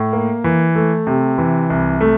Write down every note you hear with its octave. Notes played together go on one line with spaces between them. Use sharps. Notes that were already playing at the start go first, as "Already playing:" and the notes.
Already playing: A2
A#3
E3
A3
C3
E3
C2
A3